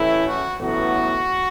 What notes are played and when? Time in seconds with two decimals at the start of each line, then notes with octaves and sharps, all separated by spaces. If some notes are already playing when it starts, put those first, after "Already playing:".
Already playing: A1 A2 A3 C#4 E4
0.25 F#4
0.59 A1 A2 F#3 B3 E4 F#4